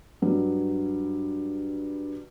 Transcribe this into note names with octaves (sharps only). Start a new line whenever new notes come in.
G2 F#3